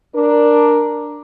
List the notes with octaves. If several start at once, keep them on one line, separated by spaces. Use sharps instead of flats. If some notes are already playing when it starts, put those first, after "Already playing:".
D4 A#4